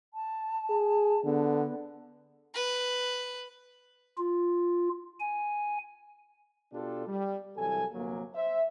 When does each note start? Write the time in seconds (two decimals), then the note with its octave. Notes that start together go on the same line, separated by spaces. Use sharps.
0.14 A5
0.70 G#4
1.25 D3 B3
2.54 B4
4.18 F4
5.20 G#5
6.73 B2 D4 F4 G4 A4
7.07 G3
7.56 C2 E3 F#3 A4 G#5
7.92 G1 C3 F#3 A#3
8.35 C5 E5